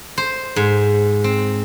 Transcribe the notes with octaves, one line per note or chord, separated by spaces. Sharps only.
C5
G#2
C4